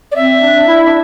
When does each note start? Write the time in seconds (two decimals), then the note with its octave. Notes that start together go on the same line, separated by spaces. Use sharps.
0.11 D5
0.16 C4 E5
0.40 D4
0.66 E4
0.86 D4